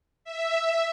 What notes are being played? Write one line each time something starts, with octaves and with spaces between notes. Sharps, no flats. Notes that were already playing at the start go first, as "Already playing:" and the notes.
E5